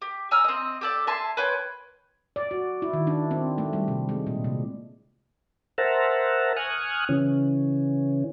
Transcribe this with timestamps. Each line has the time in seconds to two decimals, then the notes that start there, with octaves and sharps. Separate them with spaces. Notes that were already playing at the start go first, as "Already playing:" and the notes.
0.02 G4
0.31 G#5 A#5 E6 F6
0.44 C4 D#5
0.81 G4 A4 D5
1.07 E5 G#5 A5 C6
1.37 B4 C#5 G5 C6
2.36 D5
2.51 F#4
2.82 E4
2.93 D#3
3.07 D4
3.31 C4
3.58 A3
3.73 G3
3.88 C3
4.09 G#3
4.27 A#2
4.44 C3
5.78 A#4 C5 E5 F#5 A5 A#5
6.56 G#5 C#6 D#6 F6 F#6
7.09 C#3 E3 C#4